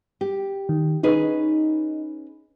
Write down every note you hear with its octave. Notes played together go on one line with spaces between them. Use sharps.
G4
D#3
C#4 D#4 G#4 B4